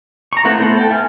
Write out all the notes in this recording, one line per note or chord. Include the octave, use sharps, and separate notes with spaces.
A#5 C#6
A3 C4 E4 B4 F#5
A3 B3 E4 A4 C5
A4 G5
E5 G#5 F6